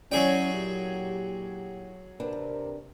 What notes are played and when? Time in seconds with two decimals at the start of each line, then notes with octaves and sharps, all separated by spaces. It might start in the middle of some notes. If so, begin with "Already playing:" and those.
0.12 F#3 C#4 E4 G#4 D5 G5
0.53 A#2 G4
2.20 C3 C4 D4 A#4 B4